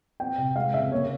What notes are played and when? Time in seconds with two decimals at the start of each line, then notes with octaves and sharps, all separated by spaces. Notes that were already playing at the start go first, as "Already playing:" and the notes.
0.20 C4 G5
0.38 C3
0.56 G#3 F5
0.74 C#3 E5
0.92 A#3 C#5